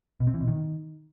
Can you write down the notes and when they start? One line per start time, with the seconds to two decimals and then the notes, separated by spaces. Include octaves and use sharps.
0.20 B2
0.27 C4
0.34 E3
0.41 B2
0.48 D#3